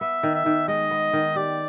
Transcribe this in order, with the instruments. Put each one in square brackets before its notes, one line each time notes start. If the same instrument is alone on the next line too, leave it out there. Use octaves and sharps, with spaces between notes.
[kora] B3 [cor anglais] E5
[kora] D#3
[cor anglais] E5
[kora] D#3
[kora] G#3 [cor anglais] D#5
[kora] B3
D#3
[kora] G4 [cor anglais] D5